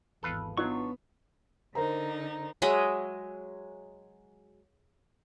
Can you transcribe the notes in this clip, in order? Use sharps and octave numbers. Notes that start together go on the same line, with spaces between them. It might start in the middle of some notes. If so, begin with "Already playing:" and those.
G#1 E2 A4 B4 F5
F#3 B3 D4 D#4 F4 B4 C#6
D3 D#4 A#4 C5 A#5
F#3 G#3 D#5 E5